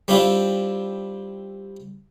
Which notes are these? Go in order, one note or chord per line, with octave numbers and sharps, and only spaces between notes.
G3 C4 D4 E4 F4